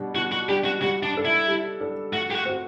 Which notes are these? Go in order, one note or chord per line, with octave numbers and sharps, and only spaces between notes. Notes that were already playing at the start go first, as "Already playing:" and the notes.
Already playing: B2 G3 D4
B2 F#4
F#4
G3 D4 G4
F#4
G3 F#4
D4
D4 A4
E4
G3
D4 A4
A3 F#4
G4
F#4
C4 F#4